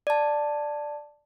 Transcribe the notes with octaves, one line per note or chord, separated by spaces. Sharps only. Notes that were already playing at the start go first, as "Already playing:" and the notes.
D5 A5